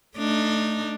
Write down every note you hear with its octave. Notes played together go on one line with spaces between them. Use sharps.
A3 D4 D#4